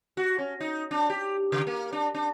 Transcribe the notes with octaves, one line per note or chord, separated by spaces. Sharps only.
F#4
C#4
D#4
D4
G4
C#3
A#3
D4
D4